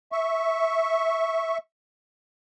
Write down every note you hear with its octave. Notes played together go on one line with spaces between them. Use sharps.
E5 C#6